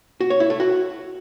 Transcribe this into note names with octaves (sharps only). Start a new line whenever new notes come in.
F#4
C#5
E4
A3
F#4